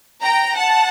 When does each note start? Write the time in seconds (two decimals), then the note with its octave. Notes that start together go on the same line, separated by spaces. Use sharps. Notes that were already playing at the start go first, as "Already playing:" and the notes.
0.22 G5 A#5
0.56 F#5 A5